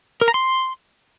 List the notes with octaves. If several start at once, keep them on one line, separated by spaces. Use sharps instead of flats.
A#4
A#5
C6